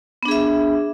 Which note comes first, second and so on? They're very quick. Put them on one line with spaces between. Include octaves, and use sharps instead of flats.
B3 D4 G#4 E5